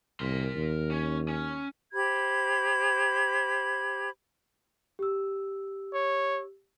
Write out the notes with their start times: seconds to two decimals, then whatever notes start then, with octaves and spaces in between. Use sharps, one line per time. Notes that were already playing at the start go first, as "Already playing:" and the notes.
0.20 C2 A#4 C6
0.55 D#2
0.91 C#4
1.28 C#4
1.93 G4 C5 B5 G#6
4.99 G4 E6
5.93 C#5